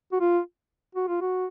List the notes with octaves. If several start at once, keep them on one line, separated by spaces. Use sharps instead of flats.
F#4
F4
F#4
F4
F#4